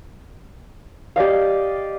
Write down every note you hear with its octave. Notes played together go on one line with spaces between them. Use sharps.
G4 D5 D#5 F5